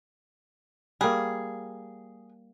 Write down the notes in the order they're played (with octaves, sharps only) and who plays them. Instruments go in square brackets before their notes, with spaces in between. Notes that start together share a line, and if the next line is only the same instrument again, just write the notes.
[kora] G3 A#3 [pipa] G#4